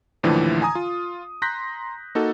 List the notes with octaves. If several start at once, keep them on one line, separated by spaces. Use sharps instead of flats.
D#2 A2 D3 E3 F3
G#5 A#5 D#6
F4
A#5 C6 F#6 G6 A#6 B6
A#3 D#4 F#4 A4